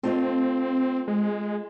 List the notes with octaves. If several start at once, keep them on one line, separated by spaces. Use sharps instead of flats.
A3 C4 F4 D#5
G#3